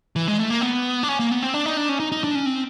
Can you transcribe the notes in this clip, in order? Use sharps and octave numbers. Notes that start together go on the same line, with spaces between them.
E3
G#3
A3
A#3
B3
D4
C#4
A#3
B3
C4
D4
D#4
D4
C#4
D#4
D#4
D4
C#4
C4